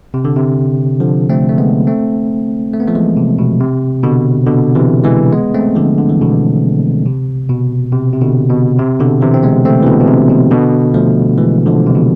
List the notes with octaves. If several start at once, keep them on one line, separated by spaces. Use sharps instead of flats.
C3
D3
C3
D3 F3
A3 C4
A3
G#3 B3
A3 C4
A3
B3
F3 A3
E3 G#3
C3
B2
C3
B2 D3
B2 D3
C3 E3
E3 G#3
G#3 B3
A3 C4
D3 F3
D3
E3
B2 D3
C3
B2
C3
C3
B2 D3
B2
C3
B2 D3
C3 E3
C4
G#3 B3
A3 C4
E3
B2 D3
B2
C3
B2
B2 D3
F3 A3
E3 G#3
D3 F3
C3
B2